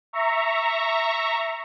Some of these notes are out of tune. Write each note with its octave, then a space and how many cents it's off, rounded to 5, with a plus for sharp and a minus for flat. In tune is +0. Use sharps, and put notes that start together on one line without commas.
E5 +5 A#5 -10 C#6 +0